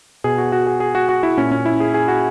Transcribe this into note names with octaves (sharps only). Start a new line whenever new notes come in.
B2 G#4
F#4
F#4
G#4
G#4
F#4
F#4
E4
A#2 C#4
C#4
E4
G#4
G#4
F#4